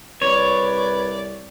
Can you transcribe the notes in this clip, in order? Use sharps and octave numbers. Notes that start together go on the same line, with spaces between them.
C2 B4 C#5 D5